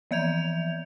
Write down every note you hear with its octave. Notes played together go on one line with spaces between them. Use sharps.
E3 F3 E5 G6 G#6 F7